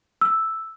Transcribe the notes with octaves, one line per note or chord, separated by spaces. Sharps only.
E6